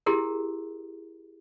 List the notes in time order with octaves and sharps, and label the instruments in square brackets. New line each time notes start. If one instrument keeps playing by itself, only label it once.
[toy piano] E4 G4 G#4 A#4